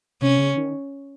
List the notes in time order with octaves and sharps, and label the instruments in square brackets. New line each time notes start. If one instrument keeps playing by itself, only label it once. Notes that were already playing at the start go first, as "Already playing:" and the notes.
[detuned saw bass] C3 [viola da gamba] C#4
[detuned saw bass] C#3
D#3